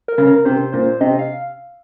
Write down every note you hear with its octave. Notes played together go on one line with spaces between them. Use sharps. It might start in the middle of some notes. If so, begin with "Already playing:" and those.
A#4
C#3
A#4
C3 C5
A#2 C5
C3 D#5
F5